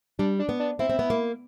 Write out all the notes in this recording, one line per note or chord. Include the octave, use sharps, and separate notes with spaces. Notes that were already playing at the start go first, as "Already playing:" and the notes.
G3 D4
D4
B3
D4
C4 E4
C4
B3
A#3